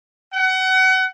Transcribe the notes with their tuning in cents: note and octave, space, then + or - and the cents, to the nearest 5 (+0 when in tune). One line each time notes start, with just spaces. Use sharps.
F#5 +30